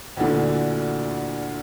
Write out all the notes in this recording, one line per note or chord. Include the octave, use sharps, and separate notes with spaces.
D2 A#2 D3 E3